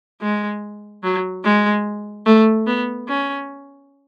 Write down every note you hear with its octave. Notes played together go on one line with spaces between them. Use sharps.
G#3
F#3
G#3
A3
B3
C#4